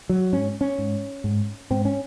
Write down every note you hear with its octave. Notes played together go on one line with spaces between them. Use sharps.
F#3
G#2 C#4
C#4
G#2
G#2
G#2 C4
C#4